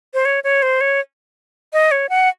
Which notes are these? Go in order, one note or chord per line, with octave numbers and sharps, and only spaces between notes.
C5
C#5
C#5
C5
C#5
D#5
C#5
F#5